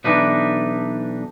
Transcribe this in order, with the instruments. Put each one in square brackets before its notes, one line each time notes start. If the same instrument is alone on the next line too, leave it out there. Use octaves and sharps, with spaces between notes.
[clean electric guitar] B1 E3 D4 D#4 B4